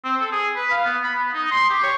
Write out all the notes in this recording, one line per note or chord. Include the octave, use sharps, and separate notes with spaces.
C4
A4
G#4
B4
F5
B3
B5
B3
D#4
C6
G4
C#5